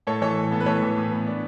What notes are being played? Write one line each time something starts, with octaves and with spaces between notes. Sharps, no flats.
A2 A4 C#5
E3 A4 C#5
A2
B3 A4
B4
A2 A4 C#5
E3
A2
B3
D4